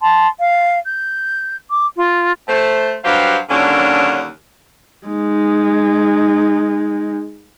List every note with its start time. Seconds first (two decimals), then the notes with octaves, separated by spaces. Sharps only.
0.02 A5 C6
0.40 F5
0.84 G6
1.71 D6
1.96 F4
2.48 A3 C5
3.04 G2 F#3 G4 C5 F5
3.50 D#2 D3 F#3 A#3 C#4 D4
5.07 G#3 D#4